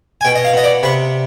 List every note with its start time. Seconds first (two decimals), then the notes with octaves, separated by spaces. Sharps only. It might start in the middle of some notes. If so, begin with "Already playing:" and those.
0.21 G#5
0.25 B2 G5
0.35 D#5
0.45 F5
0.54 B3 D#5
0.64 D5
0.83 C3 B4